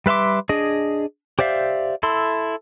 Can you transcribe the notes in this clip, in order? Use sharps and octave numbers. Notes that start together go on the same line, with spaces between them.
G3 B4 E5 C6 D6
D4 G#4 D#5
G4 C5 D5 E5 F5
E4 A4 C6